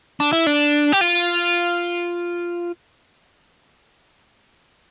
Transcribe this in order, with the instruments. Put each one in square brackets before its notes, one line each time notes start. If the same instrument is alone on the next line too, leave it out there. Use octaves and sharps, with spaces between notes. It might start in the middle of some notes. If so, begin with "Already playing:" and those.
[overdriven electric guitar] D4
E4
D4
G4
F4